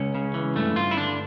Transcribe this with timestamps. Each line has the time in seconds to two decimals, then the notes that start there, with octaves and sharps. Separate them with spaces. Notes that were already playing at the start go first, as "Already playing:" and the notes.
Already playing: C#2 C#4
0.15 C#3
0.34 E3
0.56 G2 A3
0.76 G2 F4
0.91 E4
0.97 D3 D4